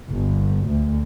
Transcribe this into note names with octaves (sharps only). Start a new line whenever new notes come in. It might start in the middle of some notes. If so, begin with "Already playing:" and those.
G1
D2